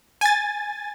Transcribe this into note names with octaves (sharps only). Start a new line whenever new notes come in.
G#5 A6